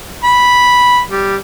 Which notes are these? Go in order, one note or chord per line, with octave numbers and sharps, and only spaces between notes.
B5
G3